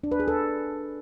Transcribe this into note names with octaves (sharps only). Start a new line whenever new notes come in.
D4
B4
G#4
A4